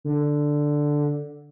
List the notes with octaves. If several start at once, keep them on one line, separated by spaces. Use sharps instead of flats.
D3